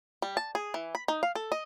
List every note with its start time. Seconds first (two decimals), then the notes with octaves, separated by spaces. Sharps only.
0.22 G3
0.37 A5
0.55 G#4
0.74 E3
0.95 B5
1.08 D#4
1.23 F5
1.35 A4
1.52 D#5